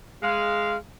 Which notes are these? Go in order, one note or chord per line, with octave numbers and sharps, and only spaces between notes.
G#3 F5